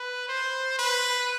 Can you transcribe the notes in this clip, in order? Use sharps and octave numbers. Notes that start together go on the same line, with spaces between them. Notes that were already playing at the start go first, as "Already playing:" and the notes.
Already playing: B4
C5
B4